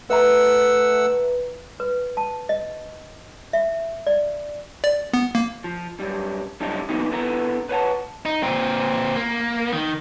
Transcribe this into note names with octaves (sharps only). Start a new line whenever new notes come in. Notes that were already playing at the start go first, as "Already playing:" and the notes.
A3 B4 E5 F#5 A#5 E6
B4
A5
D#5
E5
D5
D5
B3
A#3
F3
F#2 G3
F#3 G3 D4 E4 G4 D#5
C#3 E3 F#3 A#3 B3 D#4
D3 B3 E4 D5 A#5
B4 C#5 F#5 A5
D#4
A#2 C4
A#3
D#3